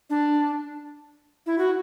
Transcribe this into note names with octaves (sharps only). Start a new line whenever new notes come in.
D4
E4
F#4